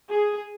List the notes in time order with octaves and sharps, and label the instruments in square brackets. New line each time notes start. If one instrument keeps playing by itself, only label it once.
[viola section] G#4